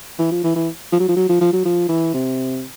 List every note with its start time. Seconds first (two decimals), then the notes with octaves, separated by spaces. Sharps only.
0.19 E3
0.31 F3
0.44 E3
0.55 E3
0.92 F3
1.00 F#3
1.08 F3
1.16 F#3
1.29 F3
1.41 F3
1.53 F#3
1.65 F3
1.89 E3
2.14 C3